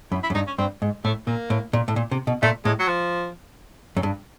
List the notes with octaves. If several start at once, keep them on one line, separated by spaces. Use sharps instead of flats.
F#2 E4
E4
F#2
G2 D#4
C#4
G2 C4
G#2
A2 A3
A#2 A#3
A2
A#2
A2
A#2
C3
B2
A#2 A3
A2 G#3
F#3
F3
F#2
G2